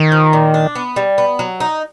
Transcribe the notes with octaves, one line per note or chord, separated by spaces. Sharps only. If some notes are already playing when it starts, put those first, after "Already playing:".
Already playing: D#3
F3
A#2
D4
B3
G3
B3
F#3
D#4